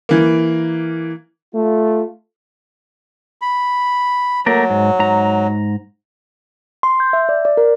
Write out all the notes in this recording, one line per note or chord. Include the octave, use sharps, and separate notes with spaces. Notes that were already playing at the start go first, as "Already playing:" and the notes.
E3 A#3
A3 F4
B5
F#3 A3 A#3 A#4
G#2
G#2 A#5
C6
G6
E5
D5
D5
A#4